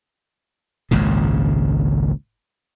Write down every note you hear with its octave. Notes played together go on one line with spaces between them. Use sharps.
G#1 C#2 A#2 C#3